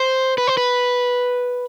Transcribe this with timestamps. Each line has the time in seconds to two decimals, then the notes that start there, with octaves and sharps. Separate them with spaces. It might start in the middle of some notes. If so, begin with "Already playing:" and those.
Already playing: C5
0.38 B4
0.47 C5
0.57 B4